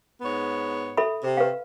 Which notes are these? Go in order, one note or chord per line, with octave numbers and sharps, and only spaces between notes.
G#2 B3 C#5
A4 E5 B5
C3
B4 F5